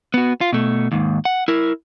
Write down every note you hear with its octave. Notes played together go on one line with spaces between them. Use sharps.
B3 F#4
F4
B2 A3
D#2 G#2
F#5
E4 A#4